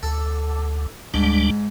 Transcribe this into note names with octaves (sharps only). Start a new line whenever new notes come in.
D2 A4
D2 G#2 G3 D4